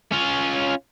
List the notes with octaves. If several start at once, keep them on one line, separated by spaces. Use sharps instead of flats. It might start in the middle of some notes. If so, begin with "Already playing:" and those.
C#4 F4